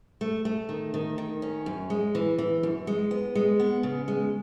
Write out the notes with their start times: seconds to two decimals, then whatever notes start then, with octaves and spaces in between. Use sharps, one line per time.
0.21 A3
0.45 A3
0.69 D#3
0.94 D#3
1.18 D#3
1.42 C#4
1.66 F#2
1.90 G#3
2.15 E3
2.38 E3
2.63 F#2
2.87 G#3
3.11 B3
3.35 G#3
3.60 B3
3.83 C#3
4.08 G#3